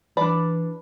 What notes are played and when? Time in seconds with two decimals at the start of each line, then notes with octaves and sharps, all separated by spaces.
0.17 E3 D4 B4 D5 B5